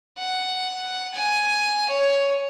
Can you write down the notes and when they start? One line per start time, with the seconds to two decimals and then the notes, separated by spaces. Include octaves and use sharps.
0.18 F#5
1.14 G#5
1.89 C#5